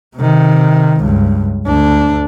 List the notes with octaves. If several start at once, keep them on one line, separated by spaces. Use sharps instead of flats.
C3 D#3
C#2 G2
D2 D4